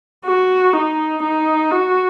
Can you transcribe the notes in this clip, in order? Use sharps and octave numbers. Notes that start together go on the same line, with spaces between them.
F#4
D#4
D#4
F#4